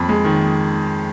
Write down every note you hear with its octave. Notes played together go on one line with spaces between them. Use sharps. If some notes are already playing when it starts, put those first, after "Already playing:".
Already playing: F2 B5
G#3
D#3